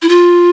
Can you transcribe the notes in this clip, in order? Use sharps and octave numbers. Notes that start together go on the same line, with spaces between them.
E4
F4